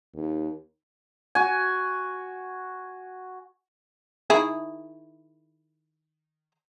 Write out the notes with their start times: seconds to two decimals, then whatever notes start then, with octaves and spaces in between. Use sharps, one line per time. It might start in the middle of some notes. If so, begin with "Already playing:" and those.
0.15 D#2
1.35 F#4 G#5
4.30 D#3 E4 G#4